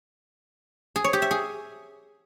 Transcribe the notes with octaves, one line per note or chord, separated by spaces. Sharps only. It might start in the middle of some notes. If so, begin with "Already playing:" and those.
G#4
C#5
G4
E5
G#4